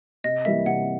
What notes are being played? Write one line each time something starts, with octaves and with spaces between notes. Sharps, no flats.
C3 D#5
E3 G3 A#3 E5
C3 F#5